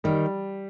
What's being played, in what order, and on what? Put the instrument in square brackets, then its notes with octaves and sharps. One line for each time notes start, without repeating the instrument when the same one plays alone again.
[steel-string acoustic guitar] D#3 [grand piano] G3